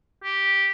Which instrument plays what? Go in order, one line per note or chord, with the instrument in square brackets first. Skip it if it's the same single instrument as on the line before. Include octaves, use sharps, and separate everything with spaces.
[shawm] G4